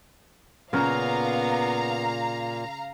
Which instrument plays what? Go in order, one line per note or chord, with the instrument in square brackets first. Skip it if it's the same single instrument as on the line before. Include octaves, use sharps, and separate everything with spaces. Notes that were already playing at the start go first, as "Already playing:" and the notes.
[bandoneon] A#2 [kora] C#3 A#4 C#5 [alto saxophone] B3 [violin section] F5 A#5